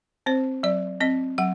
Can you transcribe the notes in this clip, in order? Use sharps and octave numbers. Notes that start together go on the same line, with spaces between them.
C4 C5
F#3 D5
C4 D#5
F#3 F#5